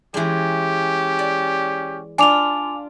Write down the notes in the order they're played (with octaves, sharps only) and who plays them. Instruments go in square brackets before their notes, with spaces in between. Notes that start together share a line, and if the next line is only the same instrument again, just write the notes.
[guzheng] E3 G#3 [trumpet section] C#4 G4
[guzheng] D5
[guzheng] D4 F4 [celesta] G#5 D6 F7